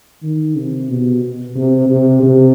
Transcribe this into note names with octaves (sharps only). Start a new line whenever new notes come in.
D#3
C3
B2
C3
C3
C3